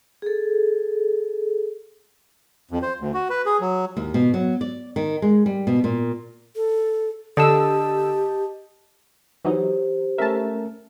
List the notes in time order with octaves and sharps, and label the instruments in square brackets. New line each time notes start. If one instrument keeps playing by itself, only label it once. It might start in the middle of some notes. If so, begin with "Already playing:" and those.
[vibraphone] G#4 A4
[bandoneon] F2
C5
D2
F#4
B4
G#4
F#3
[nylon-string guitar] D#2
B2
F#3
D5
D#3
G#3
G3
B2
A#2
[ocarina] A4
[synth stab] D3 E6 [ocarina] G4 [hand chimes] D#5 A5 D#6
[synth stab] E3 F#3 D#4 [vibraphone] G4 C5
[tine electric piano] A3 C#4 A#4 [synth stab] E5 A5